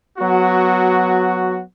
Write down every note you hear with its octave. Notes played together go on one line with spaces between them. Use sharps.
F#3 B3 F#4